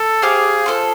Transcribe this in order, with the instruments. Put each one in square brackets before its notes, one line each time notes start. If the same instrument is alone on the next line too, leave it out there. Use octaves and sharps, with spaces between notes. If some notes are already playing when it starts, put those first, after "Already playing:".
Already playing: [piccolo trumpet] A4
[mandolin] G4 C5 F5 [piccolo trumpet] G#4
[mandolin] F4 A4 C5